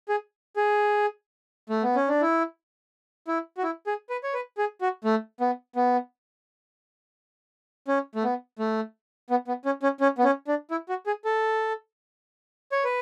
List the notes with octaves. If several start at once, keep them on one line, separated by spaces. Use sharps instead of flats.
G#4
G#4
A3
B3
C#4
D4
E4
E4
F#4
E4
G#4
B4
C#5
B4
G#4
F#4
A3
B3
B3
C#4
A3
B3
A3
B3
B3
C#4
C#4
C#4
B3
C#4
D4
E4
F#4
G#4
A4
C#5
B4